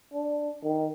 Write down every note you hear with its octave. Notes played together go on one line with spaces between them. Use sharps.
D4
D#3